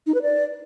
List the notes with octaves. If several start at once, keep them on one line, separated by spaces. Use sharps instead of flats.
D#4
B4
D5